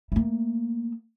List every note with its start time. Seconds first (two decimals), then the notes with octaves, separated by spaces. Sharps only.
0.12 A3 A#3